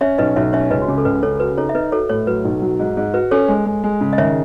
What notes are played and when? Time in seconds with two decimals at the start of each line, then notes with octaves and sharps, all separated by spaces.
0.01 C#4 C#5 E5
0.18 B1 B4 D#5
0.36 B1 C#5 E5
0.53 C#4 C#5 E5
0.70 C#2 B4 D#5
0.82 F#4
0.88 C#3 G#4
0.98 A4
1.05 C#2 B4
1.23 C#3 A4 C#5
1.36 A4
1.40 F#4 B4
1.57 D#4 A4 C#5
1.69 E5
1.75 D#4 B4 D#5
1.92 F#4 A4 C#5
2.09 A2 A4 C#5
2.27 F#3 B4
2.45 B1
2.62 F#3
2.79 G#2
2.97 G#2
3.14 F#4 B4
3.31 C#4 A4 C#5
3.48 G#3
3.66 G#3
3.84 G#3
4.01 C#3
4.13 D#5
4.18 D#3 C#5 E5